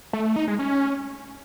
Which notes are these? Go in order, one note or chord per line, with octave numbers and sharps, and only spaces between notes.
A3
A3
D#4
G#3
C#4